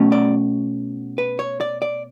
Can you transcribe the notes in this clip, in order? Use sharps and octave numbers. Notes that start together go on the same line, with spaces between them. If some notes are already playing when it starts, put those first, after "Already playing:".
Already playing: B2 A3 C#4
D5
B4
C#5
D5
D5